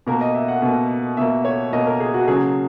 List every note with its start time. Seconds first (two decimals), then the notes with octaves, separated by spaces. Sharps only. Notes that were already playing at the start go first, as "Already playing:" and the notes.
0.07 B2 A#3 A#4
0.21 D#5
0.35 E5
0.48 F#5
0.62 B2 A#3
1.17 B2 A#3 E5
1.45 C#5
1.73 B2 A#3 D#5
1.87 A#4
2.00 G#4
2.14 F#4
2.28 C#3 F#3 A#3 G#4